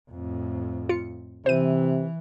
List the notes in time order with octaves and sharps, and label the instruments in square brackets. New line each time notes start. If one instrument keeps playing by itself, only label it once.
[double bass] F2 A2
[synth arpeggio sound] F4 C#7
[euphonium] C3 [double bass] E3 [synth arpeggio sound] C5 D#7